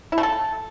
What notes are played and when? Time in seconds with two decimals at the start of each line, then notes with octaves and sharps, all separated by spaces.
0.12 E4
0.18 A3
0.23 A4